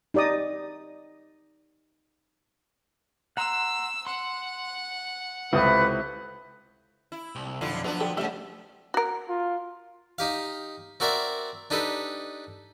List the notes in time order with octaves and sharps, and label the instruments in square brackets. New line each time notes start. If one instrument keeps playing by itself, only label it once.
[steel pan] D#4 G4 D5 D#5 D#6
[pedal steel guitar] F#5 A#5 C6 [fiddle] E6
[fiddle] F#5 [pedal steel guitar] C6
[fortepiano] C#2 C3 D#6 [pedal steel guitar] E4 A4 C5 [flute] B4
[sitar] E4
[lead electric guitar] C2
[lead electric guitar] B1 F2 [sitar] D3 E4 F4
[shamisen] D3 [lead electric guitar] F3 F#3 [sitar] B3 D4
[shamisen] A4 G5
[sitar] G#2 C#3 E5 [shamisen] G3 [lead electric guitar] A3
[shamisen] F#4 A#4
[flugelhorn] F4
[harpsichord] D#4 G4 F5
C4 F#4 A#4 D5 E5
D4 D#4 G4 A4 B4